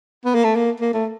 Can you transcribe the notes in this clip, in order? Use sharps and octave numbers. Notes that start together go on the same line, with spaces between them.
B3
A#3
A3
A#3
A#3
A3